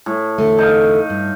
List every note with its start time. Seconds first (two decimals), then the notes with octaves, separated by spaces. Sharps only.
0.06 A2
0.38 E2 D3 A3
0.58 D#4 F5
1.10 G2